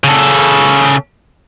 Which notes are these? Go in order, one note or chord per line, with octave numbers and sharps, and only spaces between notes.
C#3 A4